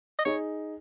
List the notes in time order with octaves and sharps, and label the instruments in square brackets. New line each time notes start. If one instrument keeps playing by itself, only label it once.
[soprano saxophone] D#5
[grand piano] D#4 G#4 [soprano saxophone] C#5